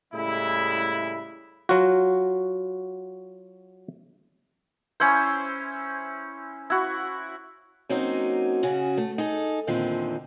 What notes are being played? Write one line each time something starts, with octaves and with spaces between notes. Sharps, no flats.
A2 C#3 G3 G#3 E4
F#3 F4 F#4
C#4 E4 C5
E4 F#4
F#3 A#3 C4 C#4 D#4 F#4
C#3 C#4 F#4 G#4
A3
D#4 G#4 A4
E2 A#2 D3 D#3 F3 C4